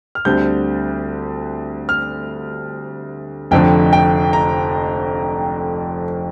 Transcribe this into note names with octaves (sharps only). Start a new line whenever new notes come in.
F6
D2 D3 G3 C4 G6
F6
F1 F2 D3 G5
G5
A#5